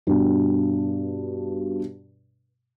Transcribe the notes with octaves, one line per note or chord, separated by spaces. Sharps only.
G2 B2 D4